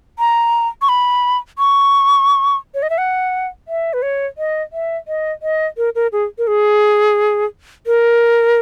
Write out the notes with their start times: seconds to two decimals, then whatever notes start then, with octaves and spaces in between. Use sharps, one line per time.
0.19 A#5
0.82 C#6
0.89 B5
1.59 C#6
2.75 C#5
2.83 D#5
2.90 E5
2.98 F#5
3.68 E5
3.93 B4
4.02 C#5
4.38 D#5
4.73 E5
5.08 D#5
5.42 D#5
5.77 A#4
5.95 A#4
6.12 G#4
6.38 A#4
6.47 G#4
7.87 A#4